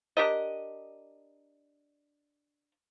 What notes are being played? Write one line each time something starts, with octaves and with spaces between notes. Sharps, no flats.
D4 G4 A#4 D#5